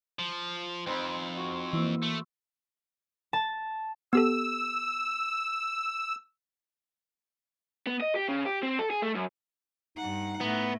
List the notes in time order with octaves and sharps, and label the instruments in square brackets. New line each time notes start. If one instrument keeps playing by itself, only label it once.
[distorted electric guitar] F3
[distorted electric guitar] F2 [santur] C4 D#4 B5
[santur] F#4
[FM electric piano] E3 A#3 [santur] E5
[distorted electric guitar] A3
[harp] A5
[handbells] B3 G4 A4 [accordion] E6
[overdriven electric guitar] B3
D#5
G4
C#3
G4
C4
A4
G#4
A3
F#2
[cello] G2 F#5 [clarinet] D#4
[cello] A2 [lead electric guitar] B3